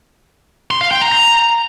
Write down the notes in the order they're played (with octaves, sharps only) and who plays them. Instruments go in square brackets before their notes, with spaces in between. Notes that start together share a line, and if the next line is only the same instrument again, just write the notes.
[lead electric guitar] C6
F5
G5
A#5
A#5